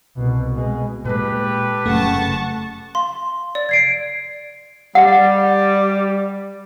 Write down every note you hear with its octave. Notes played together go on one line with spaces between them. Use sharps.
C2 B2
B2 G#3
A#2 G#3 G4 A4 B4
F1 F#2 C#3 A3 F#5 A5 C#6
F5 C6
D5
G#6 C7 D7
G3 F#5